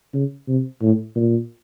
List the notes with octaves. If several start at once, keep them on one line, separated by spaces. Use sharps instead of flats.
C#3
C3
A2
A#2